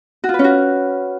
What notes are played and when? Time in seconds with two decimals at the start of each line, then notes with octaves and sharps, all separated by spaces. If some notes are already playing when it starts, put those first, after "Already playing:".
0.24 F#4
0.29 F4
0.34 B4
0.39 C#4
0.44 F#4